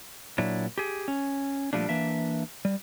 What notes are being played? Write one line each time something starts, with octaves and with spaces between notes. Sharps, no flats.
A#2 F#3 D4 E4
G4 G#4
C#4
A#2 F3 G3 A3 D4
E3 A#3 D4 E5
G3